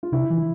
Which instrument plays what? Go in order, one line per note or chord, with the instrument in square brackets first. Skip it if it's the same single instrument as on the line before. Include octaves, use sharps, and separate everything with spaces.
[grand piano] F4
[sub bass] C3 [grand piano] E4
[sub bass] E3